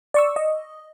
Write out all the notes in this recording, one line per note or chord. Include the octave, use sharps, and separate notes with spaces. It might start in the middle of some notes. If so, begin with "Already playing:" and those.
D5 C#6 E6
D#5